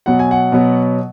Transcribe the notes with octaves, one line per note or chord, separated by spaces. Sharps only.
B2 F#3 B3 F#5
G#5
F#5
B2 F#3 B3